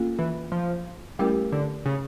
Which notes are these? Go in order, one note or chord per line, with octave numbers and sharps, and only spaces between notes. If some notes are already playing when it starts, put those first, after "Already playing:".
Already playing: A#3 C#4 F4 A4
E3
F3
G3 A3 C#4 E4 G4 A#4
D3
C#3